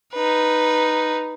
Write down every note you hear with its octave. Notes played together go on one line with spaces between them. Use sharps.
D#4 B4